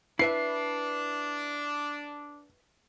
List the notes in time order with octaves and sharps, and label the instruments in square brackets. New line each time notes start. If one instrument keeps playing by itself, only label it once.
[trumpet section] D4 [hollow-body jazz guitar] E4 B4 E5 [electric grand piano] C7